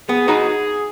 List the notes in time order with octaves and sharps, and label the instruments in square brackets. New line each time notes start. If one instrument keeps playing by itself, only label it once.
[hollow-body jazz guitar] B3 [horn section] G#4
[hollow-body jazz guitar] D#4 F#4 B4